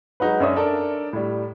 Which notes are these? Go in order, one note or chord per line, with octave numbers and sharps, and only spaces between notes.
F#3 G#3 D#4 F#4 B4
F#2 D4 C#5 E5 D#6
D4 A4 A#4
A2 G3